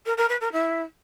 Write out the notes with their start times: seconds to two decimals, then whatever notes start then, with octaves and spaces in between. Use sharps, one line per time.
0.06 A#4
0.17 A#4
0.29 B4
0.41 A#4
0.52 E4